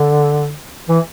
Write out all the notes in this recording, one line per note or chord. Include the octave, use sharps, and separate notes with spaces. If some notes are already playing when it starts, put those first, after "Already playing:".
Already playing: D3
E3